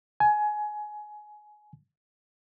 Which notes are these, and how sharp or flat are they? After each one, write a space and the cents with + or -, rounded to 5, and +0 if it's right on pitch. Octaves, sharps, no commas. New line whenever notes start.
G#5 +20